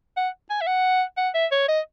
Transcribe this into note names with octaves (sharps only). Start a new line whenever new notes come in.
F#5
G#5
E5
F#5
F#5
E5
C#5
D#5